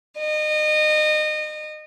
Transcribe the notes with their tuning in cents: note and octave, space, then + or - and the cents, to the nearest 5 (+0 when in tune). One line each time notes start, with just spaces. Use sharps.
D#5 -30